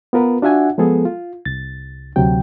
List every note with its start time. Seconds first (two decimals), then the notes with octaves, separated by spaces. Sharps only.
0.13 B3 F4 A#4 B4
0.42 D4 F4 F#4 E5 F#5 G#5
0.78 F3 G#3 B3 G#4 A4
1.05 F4
1.45 C2 A6
2.16 D2 C3 F#3 G5